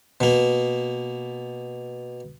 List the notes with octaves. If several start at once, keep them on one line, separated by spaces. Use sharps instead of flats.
B2 A#3